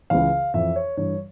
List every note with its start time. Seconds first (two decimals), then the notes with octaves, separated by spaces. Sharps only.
0.10 C#2 C#3 E3 F5
0.54 F2 E3 E5
0.76 C#5
0.97 G2 E3 C#5